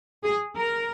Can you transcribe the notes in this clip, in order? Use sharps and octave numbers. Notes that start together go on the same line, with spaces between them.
G#4
A#4